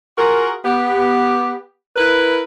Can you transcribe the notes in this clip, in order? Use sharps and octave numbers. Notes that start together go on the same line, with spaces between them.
F4 F#4 G#4 A#4
B3 G4
E4 A#4 B4